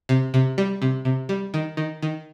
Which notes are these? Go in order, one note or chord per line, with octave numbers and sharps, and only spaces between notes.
C3
C3
G3
C3
C3
G3
D#3
D#3
D#3